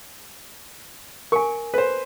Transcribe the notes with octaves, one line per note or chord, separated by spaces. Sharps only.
A#4 G#5 C#6
B4 C5